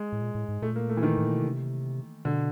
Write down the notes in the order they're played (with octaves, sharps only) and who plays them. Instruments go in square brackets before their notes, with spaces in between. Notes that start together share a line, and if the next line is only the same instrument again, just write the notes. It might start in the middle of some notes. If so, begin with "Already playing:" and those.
Already playing: [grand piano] G#3
[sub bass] A2
A#2
A2
G#2
[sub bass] A#2 [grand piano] A3
[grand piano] A#3
A3
E3
D#3
[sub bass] A2
A#2
B2
C3
[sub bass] B2 [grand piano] D3